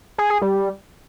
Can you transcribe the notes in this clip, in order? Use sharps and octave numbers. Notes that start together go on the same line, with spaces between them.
G#4
G#4
G3